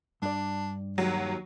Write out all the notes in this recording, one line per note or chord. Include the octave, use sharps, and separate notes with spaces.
G2 D4 D5
D#2 F#3